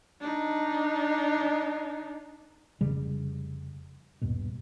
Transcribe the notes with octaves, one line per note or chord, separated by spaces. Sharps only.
D4 D#4
F1 C#3 G3
D#1 G2 B2